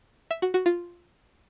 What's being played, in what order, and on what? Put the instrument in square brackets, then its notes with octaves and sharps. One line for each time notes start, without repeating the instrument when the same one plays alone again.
[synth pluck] E5
F#4
F#4
F4